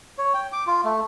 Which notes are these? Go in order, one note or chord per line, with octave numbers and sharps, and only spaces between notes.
C#5
G5
D6
F4
A3